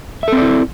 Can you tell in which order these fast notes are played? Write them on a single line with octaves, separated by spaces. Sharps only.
E5 A4 C4 D5 E4